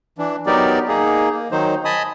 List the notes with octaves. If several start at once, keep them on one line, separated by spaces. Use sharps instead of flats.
E3 D4
F#3 B3 D#4 G4 A#4 D5
A#3 D#4 G#4
A#3
D#3 F#3 D#4 C5
D#5 G#5 A5 B5 D#6